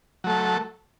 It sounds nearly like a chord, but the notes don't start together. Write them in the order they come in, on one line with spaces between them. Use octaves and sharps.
F#3 A3 A4